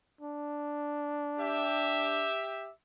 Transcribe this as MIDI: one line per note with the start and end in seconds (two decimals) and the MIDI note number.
0.21 2.31 62
1.39 2.70 67
1.39 2.70 76